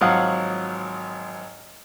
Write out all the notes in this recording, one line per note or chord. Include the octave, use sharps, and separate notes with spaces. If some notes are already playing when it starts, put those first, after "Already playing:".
G#1 F3 F#3 F5 F#5 D#6